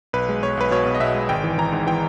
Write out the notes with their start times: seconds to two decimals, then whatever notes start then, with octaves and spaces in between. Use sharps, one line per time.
0.13 B1 B4
0.29 G#3
0.43 B1 C#5
0.57 B1 B4
0.71 B2 C#5
0.86 B2
0.95 D#5
1.00 B2 E5
1.15 G#3
1.29 G#1 G5
1.44 E3
1.58 E3 A#5
1.72 G#2
1.87 E3 G5